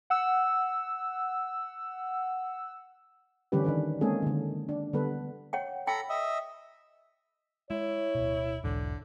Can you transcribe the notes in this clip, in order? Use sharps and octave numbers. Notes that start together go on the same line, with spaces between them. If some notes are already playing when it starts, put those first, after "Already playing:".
F#5 E6
D3 E3 G3 C#4 G4 B4
D#3 D4 B4
G#3 A#3 C4 C#4 G#4 A4
D3 D#3
D4
D3 G3 B3 A4 B4
C#5 F#5 G5
A4 G5 A#5 B5
D#5 E5
G#3 E4 C#5
D1 B2
B1 E2 G#2 D3